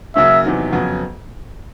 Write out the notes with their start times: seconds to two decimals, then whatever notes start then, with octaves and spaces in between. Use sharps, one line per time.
0.16 C#3 F#3 A#3 C#4 E5
0.44 E2 C3 D#3 F#3
0.72 F2 C#3 F#3 B3